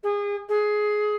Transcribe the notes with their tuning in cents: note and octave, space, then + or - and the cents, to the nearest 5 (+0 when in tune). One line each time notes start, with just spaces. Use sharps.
G#4 -30
G#4 +15